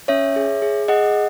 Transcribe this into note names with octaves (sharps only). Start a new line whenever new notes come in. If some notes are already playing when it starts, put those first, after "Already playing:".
C#4 C#5 E5
G#4
G#4
G#4 D#5 F#5